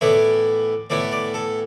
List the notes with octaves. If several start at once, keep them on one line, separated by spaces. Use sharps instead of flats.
A2 E3 B3 E4 D5
A2 E3 B3 E4 D5
D5
A4